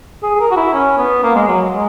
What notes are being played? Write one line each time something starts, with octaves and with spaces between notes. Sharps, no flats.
G#4
G#4
A#4
F#4
E4
C#4
B3
A#3
G#3
F#3
G#3